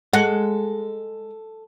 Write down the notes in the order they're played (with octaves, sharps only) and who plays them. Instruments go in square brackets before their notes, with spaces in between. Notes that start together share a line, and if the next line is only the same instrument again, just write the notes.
[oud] G#3 [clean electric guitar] A4 [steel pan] F#5